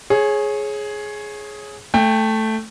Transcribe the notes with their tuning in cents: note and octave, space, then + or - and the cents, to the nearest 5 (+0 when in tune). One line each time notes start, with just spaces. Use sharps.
G#4 +10 C#5 -20
A3 +0 G5 +20